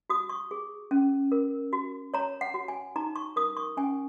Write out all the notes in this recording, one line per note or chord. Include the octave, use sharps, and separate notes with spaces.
F#4 D#6
C#6
G#4
C#4
A#4
F#4
C#5 A#5
F#5
F#4
G#5
D#4 A#5
C#6
A#4 D#6
C#6
C#4 G#5